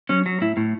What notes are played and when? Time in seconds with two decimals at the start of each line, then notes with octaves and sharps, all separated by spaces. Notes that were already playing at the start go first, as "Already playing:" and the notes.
0.09 F#3 C#4
0.26 F#3
0.41 A2 E4
0.57 A2